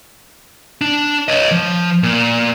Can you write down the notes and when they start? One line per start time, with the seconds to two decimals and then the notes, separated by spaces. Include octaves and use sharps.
0.81 D4
1.28 C#5 D#5
1.51 F3
2.03 A#2